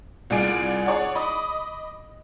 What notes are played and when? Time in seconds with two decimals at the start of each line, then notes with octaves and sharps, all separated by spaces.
0.30 C2 F4 G#4 D5 G#5 D7
0.86 G#4 C#5 D5 F#5
1.15 D#5 B5 D6 D#6